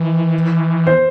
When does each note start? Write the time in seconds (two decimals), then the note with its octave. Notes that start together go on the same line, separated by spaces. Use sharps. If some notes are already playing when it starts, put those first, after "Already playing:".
Already playing: E3
0.87 C5